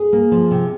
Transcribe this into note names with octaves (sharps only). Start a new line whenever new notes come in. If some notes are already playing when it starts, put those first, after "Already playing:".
Already playing: G#4
A#3
F3
C3